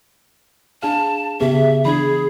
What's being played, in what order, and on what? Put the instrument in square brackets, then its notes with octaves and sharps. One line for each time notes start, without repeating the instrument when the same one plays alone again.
[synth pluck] D4 G#4 F5 [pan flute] A5
[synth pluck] C#3 B3 [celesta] G4 G#4 [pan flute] E5
[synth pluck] E3 D4 G#6 [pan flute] G#4 [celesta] B5